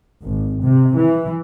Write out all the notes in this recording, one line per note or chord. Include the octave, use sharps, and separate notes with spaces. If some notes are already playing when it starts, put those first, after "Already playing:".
G#1
C3
E3